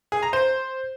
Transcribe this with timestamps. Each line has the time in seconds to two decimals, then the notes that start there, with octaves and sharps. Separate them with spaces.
0.12 G#4
0.23 A#5
0.33 C5